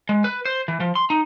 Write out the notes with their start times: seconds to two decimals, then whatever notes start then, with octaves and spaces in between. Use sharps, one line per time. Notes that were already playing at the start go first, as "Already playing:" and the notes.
0.09 G#3
0.24 B4
0.45 C5
0.68 E3
0.80 F3
0.95 C6
1.10 D#4